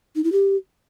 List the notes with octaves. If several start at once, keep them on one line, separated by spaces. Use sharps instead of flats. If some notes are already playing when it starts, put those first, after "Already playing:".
D#4
E4
G4